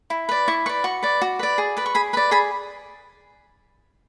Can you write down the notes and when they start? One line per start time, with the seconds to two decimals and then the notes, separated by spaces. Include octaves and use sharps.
0.10 E4
0.29 B4 D5
0.48 E4 C#6
0.66 B4 C#6
0.69 D5
0.84 F#4 C#6
1.03 B4 D5
1.22 F#4
1.39 B4 D5
1.58 G#4
1.77 B4 D5
1.86 C#6
1.95 G#4 B5
2.13 B4 B5
2.17 D5
2.31 G#4 B5